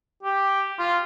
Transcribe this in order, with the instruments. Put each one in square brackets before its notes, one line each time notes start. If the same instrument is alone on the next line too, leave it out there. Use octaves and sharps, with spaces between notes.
[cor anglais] G4
F4